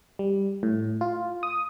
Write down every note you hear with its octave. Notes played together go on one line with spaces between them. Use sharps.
G3
A2
F4
D#6